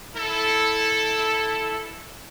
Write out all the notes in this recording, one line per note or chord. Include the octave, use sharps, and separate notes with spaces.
E4 A4